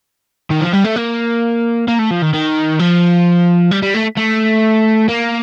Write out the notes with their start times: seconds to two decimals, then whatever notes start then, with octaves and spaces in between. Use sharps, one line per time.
0.51 D#3
0.61 F3
0.73 G3
0.85 A3
0.96 A#3
1.88 A#3
1.99 A3
2.11 F3
2.22 D#3
2.34 D#3
2.79 F3
3.71 G3
3.82 G3
3.94 A3
4.17 A3
5.09 A#3